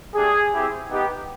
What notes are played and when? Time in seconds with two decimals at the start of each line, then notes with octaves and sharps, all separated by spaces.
0.14 A3 D4 G4 G#4
0.52 C4 E4 G4
0.90 B3 D#4 G4